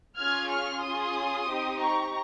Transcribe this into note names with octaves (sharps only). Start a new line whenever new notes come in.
C#4 F4 G#4 F6 G#6
C#6 F6
C#4 F4 G#4 C6 D#6
C4 D#4 G4
A#5 C#6